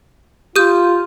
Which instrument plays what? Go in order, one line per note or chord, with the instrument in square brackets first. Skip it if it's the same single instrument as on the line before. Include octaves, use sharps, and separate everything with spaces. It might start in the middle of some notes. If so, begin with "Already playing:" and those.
[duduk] F4 [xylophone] G4 D#6 G6